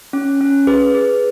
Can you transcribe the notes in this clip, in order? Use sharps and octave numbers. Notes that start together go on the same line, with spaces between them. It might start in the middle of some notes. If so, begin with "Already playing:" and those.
C#4
C#4
G#4 B4
G#4